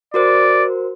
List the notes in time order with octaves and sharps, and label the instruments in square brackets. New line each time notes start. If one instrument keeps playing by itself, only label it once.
[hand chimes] F#4 A#4 C5 [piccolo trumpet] D5